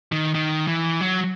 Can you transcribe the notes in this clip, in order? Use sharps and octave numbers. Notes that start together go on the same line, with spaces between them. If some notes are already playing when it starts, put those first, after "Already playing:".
D#3
D#3
E3
F#3